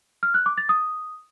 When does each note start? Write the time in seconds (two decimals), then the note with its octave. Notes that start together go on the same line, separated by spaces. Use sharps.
0.23 F6
0.34 F#6
0.46 D6
0.58 A6
0.69 D#6